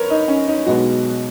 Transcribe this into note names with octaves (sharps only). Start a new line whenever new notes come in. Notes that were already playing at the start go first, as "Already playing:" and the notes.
Already playing: F#2 A#4 B4 C#5
D#4
C#4
D#4
B1 B2 G#3 B3 F#4